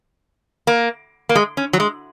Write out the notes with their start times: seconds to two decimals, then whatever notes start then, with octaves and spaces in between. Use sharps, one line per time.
0.67 A#3
1.29 A#3
1.35 G#3
1.57 C#4
1.73 F#3
1.80 G#3